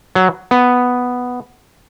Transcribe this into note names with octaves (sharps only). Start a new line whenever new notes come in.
F#3
B3